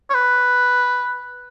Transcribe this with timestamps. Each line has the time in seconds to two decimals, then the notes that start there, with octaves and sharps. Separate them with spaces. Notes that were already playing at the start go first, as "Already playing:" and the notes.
0.10 C#5
0.15 B4